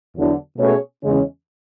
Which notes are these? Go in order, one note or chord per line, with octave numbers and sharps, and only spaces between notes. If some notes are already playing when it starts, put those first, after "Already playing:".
E2 D3 F#3
B2 A3 C#4 G#4 C#5
E2 C#3 G#3 C#4